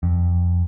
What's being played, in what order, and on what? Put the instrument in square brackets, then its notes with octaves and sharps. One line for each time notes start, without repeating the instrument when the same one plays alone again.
[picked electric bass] F2